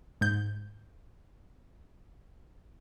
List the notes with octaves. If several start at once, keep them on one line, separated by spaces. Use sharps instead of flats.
G#2 G6